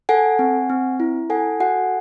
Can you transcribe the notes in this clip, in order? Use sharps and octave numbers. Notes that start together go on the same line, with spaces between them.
A4 F#5 G#5
C4
C4
E4
A4 F#5 G#5
F#4 F#5 G#5